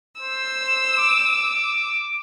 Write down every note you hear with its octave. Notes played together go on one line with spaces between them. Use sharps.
C5 E6
D6